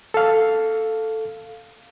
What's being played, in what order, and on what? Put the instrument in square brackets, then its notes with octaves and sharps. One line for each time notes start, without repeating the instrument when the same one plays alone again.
[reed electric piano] A4 F5